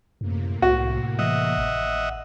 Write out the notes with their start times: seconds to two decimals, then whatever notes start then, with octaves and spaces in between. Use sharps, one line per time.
0.21 F#2 A2 C3 A#3
0.62 C2 F#4
1.19 E3 D#5 E5 F#5
1.58 G#1